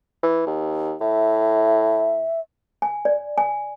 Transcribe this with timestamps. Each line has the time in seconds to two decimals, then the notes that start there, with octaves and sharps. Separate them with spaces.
0.23 E3
0.47 D#2
1.01 A2 E5
2.82 G#5
3.05 D5
3.38 G#5